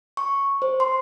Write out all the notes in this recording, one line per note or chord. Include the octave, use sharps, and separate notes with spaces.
C#6
C5
C6